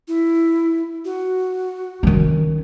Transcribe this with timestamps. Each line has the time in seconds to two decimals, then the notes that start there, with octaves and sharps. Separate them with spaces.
0.08 E4
1.05 F#4
2.03 D#3 C#4